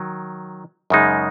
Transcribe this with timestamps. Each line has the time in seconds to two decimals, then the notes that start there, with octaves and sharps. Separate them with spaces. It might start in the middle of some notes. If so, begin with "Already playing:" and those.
Already playing: D#3 F#3
0.90 F#2 C#3 G#3 D#4